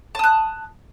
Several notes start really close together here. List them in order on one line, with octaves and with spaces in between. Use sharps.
A5 D#6 F#6